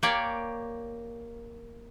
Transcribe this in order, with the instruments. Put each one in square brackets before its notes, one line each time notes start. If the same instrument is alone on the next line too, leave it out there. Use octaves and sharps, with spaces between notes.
[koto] A#3 G4 C#5 D5